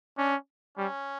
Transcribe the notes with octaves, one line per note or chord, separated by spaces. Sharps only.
C#4 D4
G3 C#4